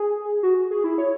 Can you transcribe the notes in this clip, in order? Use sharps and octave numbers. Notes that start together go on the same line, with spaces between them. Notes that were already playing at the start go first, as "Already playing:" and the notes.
Already playing: G#4
F#4
G#4
E4
C#5